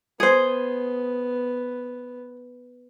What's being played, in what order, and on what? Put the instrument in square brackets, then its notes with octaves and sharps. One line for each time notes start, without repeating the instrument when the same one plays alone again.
[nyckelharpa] B3 [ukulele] G#4 C5